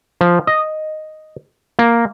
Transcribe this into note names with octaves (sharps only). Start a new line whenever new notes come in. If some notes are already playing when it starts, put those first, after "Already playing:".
F3
D#5
A#3